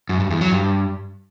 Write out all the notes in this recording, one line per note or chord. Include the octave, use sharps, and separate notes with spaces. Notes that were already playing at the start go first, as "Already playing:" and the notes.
F#2
G2
E2
F#3
G2